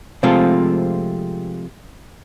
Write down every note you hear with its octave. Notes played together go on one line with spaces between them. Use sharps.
C3 F3 G#3 A3 C4 F4